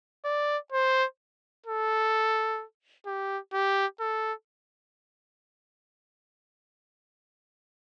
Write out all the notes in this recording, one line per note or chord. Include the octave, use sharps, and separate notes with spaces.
D5
C5
A4
G4
G4
A4